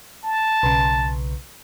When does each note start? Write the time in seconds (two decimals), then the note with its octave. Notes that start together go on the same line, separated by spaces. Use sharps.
0.24 A5
0.63 B1 C#3